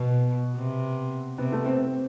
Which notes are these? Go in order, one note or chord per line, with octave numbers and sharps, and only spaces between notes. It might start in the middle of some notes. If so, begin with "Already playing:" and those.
Already playing: B2 B3
C3
C3 B3
A3
C4
C4